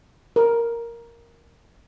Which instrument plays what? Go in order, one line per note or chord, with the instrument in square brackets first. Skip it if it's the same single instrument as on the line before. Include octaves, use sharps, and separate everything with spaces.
[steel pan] A#4